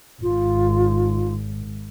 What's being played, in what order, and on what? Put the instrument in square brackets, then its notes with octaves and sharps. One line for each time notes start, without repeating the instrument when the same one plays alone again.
[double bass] G#1 [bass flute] F4